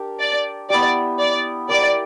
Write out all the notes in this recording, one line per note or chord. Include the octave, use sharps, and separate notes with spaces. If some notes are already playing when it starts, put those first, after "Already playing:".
Already playing: D4 G4 A#4
D5
B3 E4 G4 D5
D5
E4 G4 A#4 D5